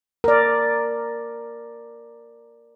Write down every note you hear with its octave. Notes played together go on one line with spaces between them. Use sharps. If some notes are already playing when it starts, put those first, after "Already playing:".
A#4 D5